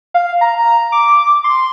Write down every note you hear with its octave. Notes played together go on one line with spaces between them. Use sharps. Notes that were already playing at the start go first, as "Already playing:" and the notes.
F5
A#5
D6
C6